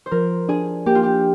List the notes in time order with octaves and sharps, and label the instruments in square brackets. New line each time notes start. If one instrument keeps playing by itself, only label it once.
[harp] C5
[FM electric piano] F3 [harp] A#4
[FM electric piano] D4 [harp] G#4
[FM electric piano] A#3 [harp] G4
[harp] F4
G4